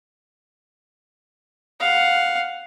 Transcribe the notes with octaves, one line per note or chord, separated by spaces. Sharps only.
F5 F#5